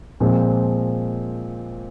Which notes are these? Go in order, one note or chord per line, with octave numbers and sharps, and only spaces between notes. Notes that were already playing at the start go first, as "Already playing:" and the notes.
A#2 F3 G#3 C4